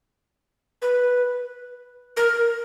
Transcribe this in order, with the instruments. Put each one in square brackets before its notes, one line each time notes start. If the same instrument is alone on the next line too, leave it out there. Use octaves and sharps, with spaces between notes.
[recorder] B4
A#4